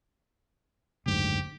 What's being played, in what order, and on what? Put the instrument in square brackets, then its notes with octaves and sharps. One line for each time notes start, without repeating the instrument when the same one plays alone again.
[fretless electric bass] F#1 D2 G#2 [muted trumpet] G4